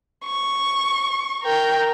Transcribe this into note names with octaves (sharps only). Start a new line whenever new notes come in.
C#6
A#4 G5